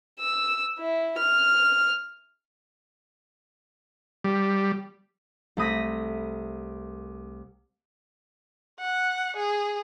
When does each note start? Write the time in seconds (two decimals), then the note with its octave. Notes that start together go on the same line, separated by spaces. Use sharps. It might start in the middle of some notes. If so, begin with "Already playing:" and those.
0.20 E6
0.79 E4
1.18 F6
4.24 G3
5.57 C2 A3 B5 D#6 A#6 B6
8.80 F#5
9.37 G#4